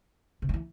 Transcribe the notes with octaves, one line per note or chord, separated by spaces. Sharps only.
C3
G3
E3